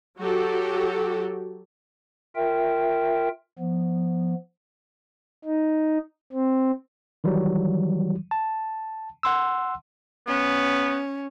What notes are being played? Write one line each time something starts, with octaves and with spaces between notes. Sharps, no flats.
F#3 F#4 G4 A4
F4 A#4 E5 G5
F3 B3
D#4
C4
D#3 E3 F#3 G3
A5
F#5 C6 E6
B3 C#4